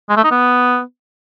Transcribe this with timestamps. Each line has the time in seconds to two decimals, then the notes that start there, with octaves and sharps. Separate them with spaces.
0.10 G#3
0.17 A3
0.24 D#4
0.31 B3